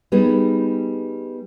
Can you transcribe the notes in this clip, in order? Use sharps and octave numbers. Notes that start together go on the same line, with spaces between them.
G3 B3 D#4 G#4